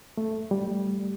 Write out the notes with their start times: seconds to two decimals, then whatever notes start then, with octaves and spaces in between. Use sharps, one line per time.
0.17 A3
0.51 G3